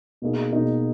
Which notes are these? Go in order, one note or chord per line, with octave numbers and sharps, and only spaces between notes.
B2 A#3 D#4 G#4
B2 A#3 D#4 G#4